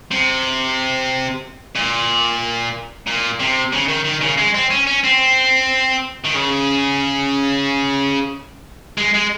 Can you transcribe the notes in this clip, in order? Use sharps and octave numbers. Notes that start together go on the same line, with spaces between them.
C3
A#2
A#2
C3
C#3
D#3
D#3
C#3
G#3
C4
C#4
C#4
C4
D#3
C#3
G#3
G#3